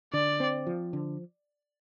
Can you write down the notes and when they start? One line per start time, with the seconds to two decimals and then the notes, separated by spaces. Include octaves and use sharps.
0.13 D3 D5
0.40 C4
0.67 F3
0.93 D3